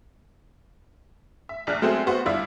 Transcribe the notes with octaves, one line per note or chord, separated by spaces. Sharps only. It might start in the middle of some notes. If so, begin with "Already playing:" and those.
E5
A#1 D4 F6 F#6
F#3 G#3 A3 C4 G#4
B3 F#4 C5
G1 D4 E4 F4 E6